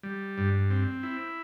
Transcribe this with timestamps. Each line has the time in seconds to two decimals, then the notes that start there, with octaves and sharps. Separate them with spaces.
0.03 G3
0.38 G2
0.70 C4
1.03 E4